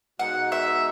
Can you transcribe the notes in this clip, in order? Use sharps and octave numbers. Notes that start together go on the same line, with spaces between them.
B2 G#3 D#4 F#5
E5